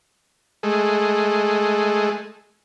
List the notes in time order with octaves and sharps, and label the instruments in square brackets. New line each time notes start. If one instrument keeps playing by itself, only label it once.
[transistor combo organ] G#3 A3